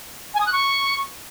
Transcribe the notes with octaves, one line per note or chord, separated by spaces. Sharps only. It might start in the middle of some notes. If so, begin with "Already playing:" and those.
G#5
D#6
F#6
C#6